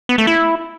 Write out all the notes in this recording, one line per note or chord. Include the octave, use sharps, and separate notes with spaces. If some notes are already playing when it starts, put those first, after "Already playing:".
B3
A3
E4